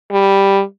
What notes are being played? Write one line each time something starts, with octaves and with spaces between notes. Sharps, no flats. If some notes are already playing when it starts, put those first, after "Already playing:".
G3